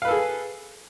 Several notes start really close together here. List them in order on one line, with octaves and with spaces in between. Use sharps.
F5 B4 A4 G#4